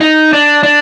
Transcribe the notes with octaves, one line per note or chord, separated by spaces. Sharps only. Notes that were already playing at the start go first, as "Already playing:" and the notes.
D#4
D4
D4